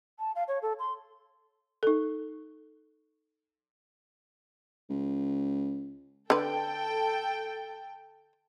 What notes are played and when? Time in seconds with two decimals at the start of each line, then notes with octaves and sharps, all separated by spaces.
0.19 A5
0.35 F5
0.48 C#5
0.62 A4
0.79 C6
1.83 D#4 A4
4.90 C#2
6.30 D3 A4 B4 G5